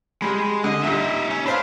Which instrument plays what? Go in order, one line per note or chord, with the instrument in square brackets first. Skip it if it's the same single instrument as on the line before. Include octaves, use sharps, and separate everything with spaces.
[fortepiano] G3 B5 [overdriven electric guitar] G#3
[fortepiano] D3 [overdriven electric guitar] D#5
[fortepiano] A#2 G3 [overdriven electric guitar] D#4 E5
[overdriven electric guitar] C#4
[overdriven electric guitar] D4 [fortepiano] B4 C5 F5